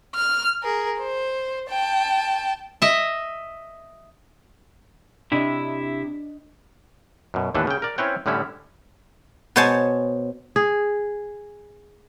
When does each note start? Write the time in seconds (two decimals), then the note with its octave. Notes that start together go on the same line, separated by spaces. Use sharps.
0.16 F6
0.63 G#4 A#4
1.00 C5
1.70 G5 A5
2.82 D#5 E5
5.32 C3 D4 E4 D#5
7.34 F#2 B2
7.54 D#2 A2 E3 D4 A4 B4
7.67 C#3 G5
7.82 A#4 D5
7.98 C4 C#4 E4 B4 C#5 G5
8.26 A2 D3 G3 C#4 E4
9.56 B2 B3 C5 C#5 G#5 A5
10.56 G#4